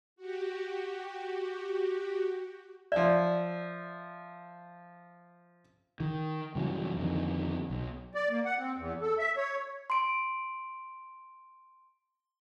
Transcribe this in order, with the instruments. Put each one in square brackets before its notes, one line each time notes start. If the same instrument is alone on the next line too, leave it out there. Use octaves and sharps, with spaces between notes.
[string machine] F#4 G4
[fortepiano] F3 E5 [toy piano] D5
[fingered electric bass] D#3
G2 C#3 E3 F#3
F2 D3 D#3
B1
[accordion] D5
A#3
F#5
C4
E2
A4
E5
C#5
[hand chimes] C6 D7